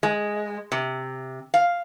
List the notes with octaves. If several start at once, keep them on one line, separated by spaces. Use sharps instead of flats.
G#3
C3
F5